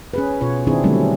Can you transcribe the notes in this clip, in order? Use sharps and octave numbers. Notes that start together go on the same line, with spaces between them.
C#4 G#4 B4
B2 F4 C#5
D#3 C4 D4 E4 G#4
D3 F#3 G3 A3 C4 C#4